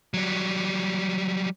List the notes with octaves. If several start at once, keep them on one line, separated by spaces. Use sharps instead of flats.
F#3 G3